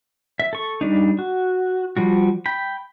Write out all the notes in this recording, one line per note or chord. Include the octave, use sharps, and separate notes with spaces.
E5
A4 C#6
G3 D4 D#4
F#4
F3 G3 F#4
G5 B5